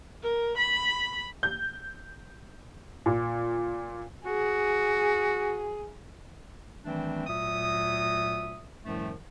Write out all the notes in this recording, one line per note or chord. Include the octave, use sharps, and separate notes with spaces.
A#4
B5
G6
A#2
F#4 G#4
D#3 E3 G3 A3 C4 D4
D2 A#2 F#3 E5 D#6
C2 F#2 A2 D#3 F3 A3